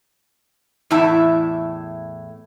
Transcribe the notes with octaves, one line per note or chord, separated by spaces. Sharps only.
E2 A2 E4 E5 A5